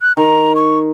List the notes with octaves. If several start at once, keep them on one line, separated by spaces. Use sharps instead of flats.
F#6
D#3 A#5
C#6